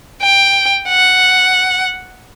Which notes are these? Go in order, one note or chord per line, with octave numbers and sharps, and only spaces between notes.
G5
F#5